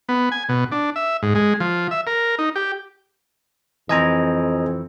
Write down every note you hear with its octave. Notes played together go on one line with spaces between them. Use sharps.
B3
G#5
B2
D4
E5
G#2
G#3
F3
E5
A#4
D#4
G4
F2 E3 C4 D#5 G#5 A#5